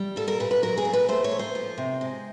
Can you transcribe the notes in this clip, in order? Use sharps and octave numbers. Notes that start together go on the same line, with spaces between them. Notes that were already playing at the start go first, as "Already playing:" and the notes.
Already playing: G3
A#2 A4
A#4
A#2 B4
B4
F#3 A#4
G#4
A#2
B4
A3 C5
C#5
A#2
C5
F3
C3
G#3